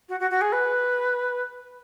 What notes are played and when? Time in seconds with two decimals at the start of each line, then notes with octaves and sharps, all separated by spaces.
0.09 F#4
0.20 F#4
0.31 F#4
0.41 G#4
0.52 B4